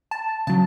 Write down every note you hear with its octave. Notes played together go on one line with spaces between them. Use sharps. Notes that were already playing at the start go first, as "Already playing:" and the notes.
A5
C#3 F#3 A5